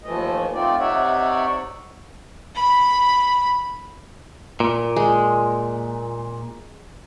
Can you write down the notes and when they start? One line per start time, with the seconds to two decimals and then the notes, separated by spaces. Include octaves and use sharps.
0.04 D#2 E3 F3 A3 D#5
0.53 A3 C4 D#4 F4 D5
0.80 C3 D#4 C#5 D5 E5 F#5
2.55 B5
4.60 A#2
4.96 G#3